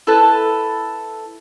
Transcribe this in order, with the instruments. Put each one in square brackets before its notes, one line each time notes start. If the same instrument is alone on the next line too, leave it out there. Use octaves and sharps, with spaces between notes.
[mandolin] E4 A4 B4 A5